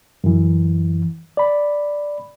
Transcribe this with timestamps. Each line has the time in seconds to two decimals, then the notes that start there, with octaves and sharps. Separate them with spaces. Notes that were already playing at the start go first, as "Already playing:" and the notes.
0.24 F#2 E3
1.37 D5 B5